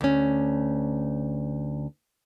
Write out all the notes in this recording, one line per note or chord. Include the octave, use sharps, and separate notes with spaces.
D2 C#4